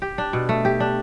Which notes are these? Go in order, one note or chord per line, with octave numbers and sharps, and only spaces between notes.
G4
D4
B2
A3
G4
D4